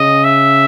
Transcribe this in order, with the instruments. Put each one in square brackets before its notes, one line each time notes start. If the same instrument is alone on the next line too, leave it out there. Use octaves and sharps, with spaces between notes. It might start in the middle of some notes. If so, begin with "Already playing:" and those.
Already playing: [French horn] C#3 [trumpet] D#5
[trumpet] E5